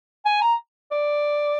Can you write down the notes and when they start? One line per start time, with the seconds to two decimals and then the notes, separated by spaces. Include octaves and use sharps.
0.25 G#5
0.41 A#5
0.92 D5